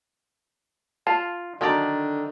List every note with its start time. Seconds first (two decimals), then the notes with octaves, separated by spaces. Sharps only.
1.07 F4 A5
1.61 D3 D#3 F#3 A4 A#4 D5